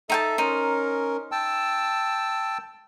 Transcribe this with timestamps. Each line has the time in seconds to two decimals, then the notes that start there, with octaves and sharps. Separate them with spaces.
0.10 D#4 A4 E5 G5 A5
0.38 C#4 D#4 A#4 C5
1.32 G5 A5 E6